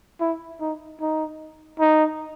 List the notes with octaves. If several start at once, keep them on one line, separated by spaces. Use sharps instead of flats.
E4
D#4
D#4
D#4